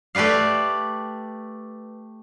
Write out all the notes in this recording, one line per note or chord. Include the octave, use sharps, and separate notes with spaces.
A3 G4 B4 D5 F5